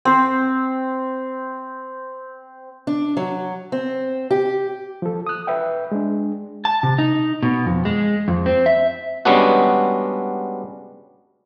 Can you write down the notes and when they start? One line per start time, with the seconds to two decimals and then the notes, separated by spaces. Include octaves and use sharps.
0.05 C4 C5
2.87 D4
3.17 F#3
3.72 C4
4.31 G4
5.02 F3 A4
5.27 D#6 F#6
5.47 B4 E5 G5
5.92 G#3 D4
6.65 A5
6.83 C3
6.98 D#4
7.43 B2
7.66 F2
7.85 G#3
8.28 F2
8.46 C4
8.66 E5
9.25 G3 G#3 B3 C#4 D4 F#4